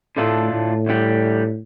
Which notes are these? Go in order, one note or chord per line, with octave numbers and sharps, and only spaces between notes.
A2 D3 A3 D4 F4 A4
A2
D2 D3 G3